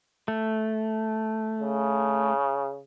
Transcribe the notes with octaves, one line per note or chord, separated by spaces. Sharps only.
A3
C#3